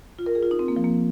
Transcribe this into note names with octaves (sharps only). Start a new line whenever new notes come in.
F4
A#4
G#4
F4
D#4
C4
A#3
F3
A#3